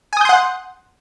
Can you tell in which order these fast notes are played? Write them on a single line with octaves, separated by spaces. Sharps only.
G#5 D#6 G6 C6 F#5